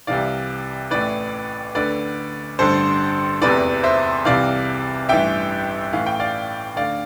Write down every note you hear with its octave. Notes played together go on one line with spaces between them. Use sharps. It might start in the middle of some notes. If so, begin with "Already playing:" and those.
C2 C3 E3 D5 F5
A1 A2 E3 B4 D5
D2 D3 B4 D5
A1 G2 D3 A4 C5
F1 E2 C3 E3 B4 D5
C5 E5
C2 C3 E3 D5 F5
A1 G2 E3 E5 G5
A1 A2 E3 F5
G5
D5 F5
D2 D3 D5 F5